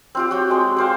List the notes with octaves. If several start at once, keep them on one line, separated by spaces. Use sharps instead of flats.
C4 F4 G4
F#4 C#5 G5
G#3 C4
G4 C5 F5